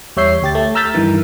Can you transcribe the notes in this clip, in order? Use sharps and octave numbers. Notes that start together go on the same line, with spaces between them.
E2 G3 C#5 E5 G6 C7
D2 G4 A6
A3
A#5 E6 F6 G6 A6 B6
G2 D#3 E3